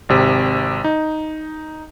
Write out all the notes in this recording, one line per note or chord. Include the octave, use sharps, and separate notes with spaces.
G#1 C3
D#4